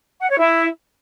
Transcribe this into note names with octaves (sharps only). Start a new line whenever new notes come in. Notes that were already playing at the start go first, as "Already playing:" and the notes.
F#5
C#5
E4